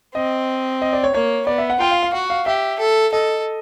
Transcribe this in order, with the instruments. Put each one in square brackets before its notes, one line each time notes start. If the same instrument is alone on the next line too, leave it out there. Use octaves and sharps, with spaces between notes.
[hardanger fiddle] C4 [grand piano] D#5
[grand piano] D#5
D5
C#5
[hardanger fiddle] A#3 [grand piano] C#5
[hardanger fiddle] B3 [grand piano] D5
[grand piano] E5
F#5
[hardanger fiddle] F4 [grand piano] G5
[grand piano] F5
F5
[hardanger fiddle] F#4 [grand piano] F#5
[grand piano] F5
[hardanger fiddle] G4 [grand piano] E5
[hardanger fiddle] A4
[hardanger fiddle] A4 [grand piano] D#5